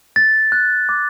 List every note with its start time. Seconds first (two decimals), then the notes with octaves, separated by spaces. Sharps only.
0.16 A6
0.52 F#6
0.89 D6